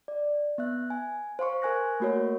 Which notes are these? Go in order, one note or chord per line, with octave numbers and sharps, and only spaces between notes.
D5
B3 E5 F#6
G#5
C5 F5 C6 C#6
A#4 G#5 F#6 A#6
A3 A#3 F#4 A#4 C#5